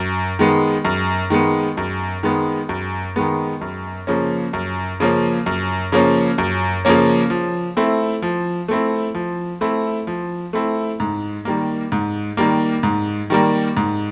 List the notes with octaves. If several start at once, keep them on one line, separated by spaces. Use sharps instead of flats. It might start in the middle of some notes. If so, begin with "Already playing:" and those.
Already playing: F#2
D#3 G#3 B3
F#2
D#3 G#3 B3
F#2
D#3 G#3 B3
F#2
D#3 G#3 B3
F#2
C#3 F3 A#3 C#4
F#2
C#3 F3 A#3 C#4
F#2
C#3 F3 A#3 C#4
F#2
C#3 F3 A#3 C#4
F3
A3 C4 E4
F3
A3 C4 E4
F3
A3 C4 E4
F3
A3 C4 E4
G#2
D#3 G3 A#3
G#2
D#3 G3 A#3
G#2
D#3 G3 A#3
G#2